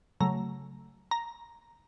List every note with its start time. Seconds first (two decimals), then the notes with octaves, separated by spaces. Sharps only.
0.20 C#3 F#3 A3 A#5
1.11 A#5